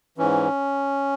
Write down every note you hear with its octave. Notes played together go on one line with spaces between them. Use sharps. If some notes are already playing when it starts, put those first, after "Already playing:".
G#2 E3 C#4